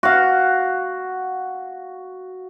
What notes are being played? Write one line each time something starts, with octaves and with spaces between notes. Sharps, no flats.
F#4 F5